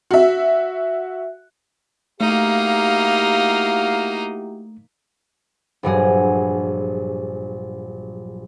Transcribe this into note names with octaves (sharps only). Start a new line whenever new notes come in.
F#4 E5
A3 A#3 D#4 E4 F#4 G4 F5
A#1 G2 F#3 G#4